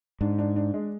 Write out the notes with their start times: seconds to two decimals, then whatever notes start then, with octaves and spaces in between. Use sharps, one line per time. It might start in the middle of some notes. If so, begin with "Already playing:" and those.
0.21 G#2 D4
0.39 D4
0.56 D4
0.74 G#3